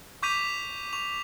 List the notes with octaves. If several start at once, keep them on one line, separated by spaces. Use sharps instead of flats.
C#6 D6 G6 B6 D#7 F7
C#6 F7